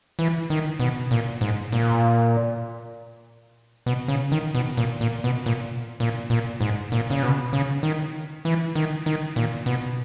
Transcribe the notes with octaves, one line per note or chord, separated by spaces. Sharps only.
E3
D#3
B2
A#2
G#2
A#2
B2
C#3
D#3
B2
A#2
A#2
B2
A#2
A#2
A#2
G#2
A#2
C#3
B2
C#3
D#3
E3
D#3
D#3
A#2
B2